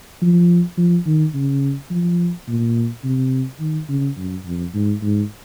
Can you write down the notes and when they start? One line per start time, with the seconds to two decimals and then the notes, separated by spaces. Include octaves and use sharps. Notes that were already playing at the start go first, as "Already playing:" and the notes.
0.22 F3
0.77 F3
1.06 D#3
1.34 C#3
1.90 F3
2.48 A#2
3.04 C3
3.60 D#3
3.89 C#3
4.17 F#2
4.46 F2
4.74 G#2
5.02 G#2